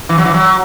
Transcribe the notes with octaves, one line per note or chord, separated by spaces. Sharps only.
E3
F#3
E3
F#3